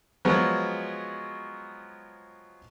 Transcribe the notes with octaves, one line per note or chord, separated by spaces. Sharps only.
F3 F#3 G#3 B3